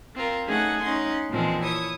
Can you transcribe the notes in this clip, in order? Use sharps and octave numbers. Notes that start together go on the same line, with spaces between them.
C4 F4 A#4
A3 C#4 D#4 G#4 A4 F#5
C#4 D#4 F#5 C6
A#2 E3 F3 G#3 C4
E4 C#5 D#6